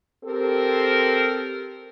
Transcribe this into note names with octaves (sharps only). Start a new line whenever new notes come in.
C4 G4 A4 A#4